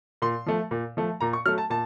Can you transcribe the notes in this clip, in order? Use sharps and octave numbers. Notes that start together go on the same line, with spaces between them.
A#2 C6
F3 A3
A#2
F3 A3
A#2 A#5
C#6
F#3 A3 F6
A5
A#2 A5